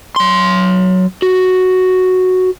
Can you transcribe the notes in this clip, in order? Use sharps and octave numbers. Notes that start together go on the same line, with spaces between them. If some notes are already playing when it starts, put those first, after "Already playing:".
F#3 C6
F#4